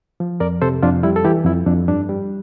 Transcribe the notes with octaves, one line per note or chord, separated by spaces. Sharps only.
F3
F2 A#4 D5
C3 A4 C5
F2 D4 F4
G3 E4
A4
E3 E4 G4
F2 E4
F2 D4
G2 D4
G3